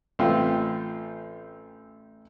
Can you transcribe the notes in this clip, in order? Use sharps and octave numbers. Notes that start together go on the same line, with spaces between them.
A1 C4 F4